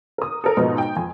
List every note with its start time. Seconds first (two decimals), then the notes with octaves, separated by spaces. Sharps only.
0.18 A#4 D#6
0.44 A4 A#4
0.57 G#2 B2 F3 B3 D#4
0.78 G5
0.96 F2 G#5